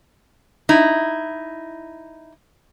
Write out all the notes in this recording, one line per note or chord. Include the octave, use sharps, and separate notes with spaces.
D#4 E4